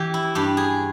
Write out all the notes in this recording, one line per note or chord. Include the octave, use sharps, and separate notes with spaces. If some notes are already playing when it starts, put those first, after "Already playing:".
Already playing: E3 G4
E4
G2 G4
G#4